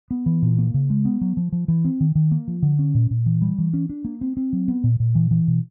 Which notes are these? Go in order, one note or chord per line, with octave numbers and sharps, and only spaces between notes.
B3
E3
A#2
A#3
C#3
G#3
B3
F#3
F3
F3
E3
C4
D#3
D#3
A#3
F3
D3
C#4
A#2
A#2
E3
G3
E3
C#4
D4
A#3
C4
C4
F#3
B3
A#2
A#2
E3
E3
B2